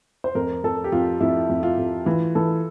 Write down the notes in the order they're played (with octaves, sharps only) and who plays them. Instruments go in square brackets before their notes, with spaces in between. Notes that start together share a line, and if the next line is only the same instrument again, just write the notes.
[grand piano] C5
[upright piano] F2 [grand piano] A#4
[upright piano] F2 [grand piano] A4
[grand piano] G4
[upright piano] F2 [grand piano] F4
[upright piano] F2 [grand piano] E4
[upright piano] F2
[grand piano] F4
[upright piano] F2
[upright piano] E3 [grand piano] F4
[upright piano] E3 [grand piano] A4